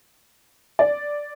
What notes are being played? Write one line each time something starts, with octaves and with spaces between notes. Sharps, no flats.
D5